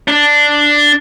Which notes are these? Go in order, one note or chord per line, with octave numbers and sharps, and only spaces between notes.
D4